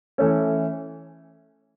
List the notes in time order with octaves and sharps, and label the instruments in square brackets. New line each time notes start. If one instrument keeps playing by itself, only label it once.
[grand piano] E3 A3 C#4